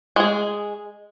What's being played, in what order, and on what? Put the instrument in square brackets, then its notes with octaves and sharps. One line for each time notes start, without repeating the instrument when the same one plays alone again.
[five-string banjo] G#3 G#4